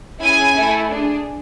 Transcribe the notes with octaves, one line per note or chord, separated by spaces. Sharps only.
C#4 E4 G#4 G#5
A3 E4 A4
D4 G#4